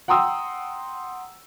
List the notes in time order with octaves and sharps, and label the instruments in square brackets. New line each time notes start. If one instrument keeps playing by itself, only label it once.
[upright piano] F#5 G5 A#5 C6 D#6 E6